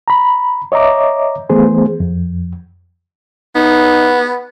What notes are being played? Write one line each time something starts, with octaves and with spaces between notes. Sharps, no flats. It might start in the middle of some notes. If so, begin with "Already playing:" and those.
A#5 B5
C#5 D#5 E5 A#5 D6
E3 A3 B3 G#4 C5
F2
B3 D#4